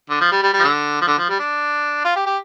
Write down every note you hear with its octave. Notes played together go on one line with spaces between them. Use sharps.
D3
F3
G3
G3
G3
F3
D3
F3
D3
F3
G3
D4
F4
G4
G4